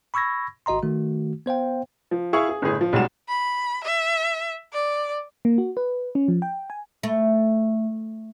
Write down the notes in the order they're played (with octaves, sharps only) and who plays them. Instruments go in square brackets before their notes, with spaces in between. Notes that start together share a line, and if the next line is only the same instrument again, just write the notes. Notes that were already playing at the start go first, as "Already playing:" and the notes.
[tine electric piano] B5 C#6 E6 G#6 A#6
G#1 F#4 D#5 A#5 C6
D#3 A3 F#4
B3 C5 F5 G5
[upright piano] F3
E4 G#4 E5 F5 C#6
G#4
G1 A2 G#4
F3
B1 G3 G#3 F#4 E7
[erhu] B5
E5
D5
[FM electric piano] A#3
F#4
B4
C#4
F3
G5
G#5
[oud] A3